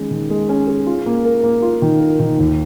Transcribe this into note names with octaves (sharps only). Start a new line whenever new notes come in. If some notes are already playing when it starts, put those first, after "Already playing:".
Already playing: D#3 G#3 C#4 G#4
D#3
G#3
C#4
G#4
F4
A#3
A#4
A#3
F4
D#3
A#4
D#3
D#2